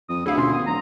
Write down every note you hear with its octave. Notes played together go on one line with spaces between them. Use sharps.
F2 D#6
D2 E4 G#4 F5
B2 C#4 F4 C6
D#3 B3 D#6
D1 A#5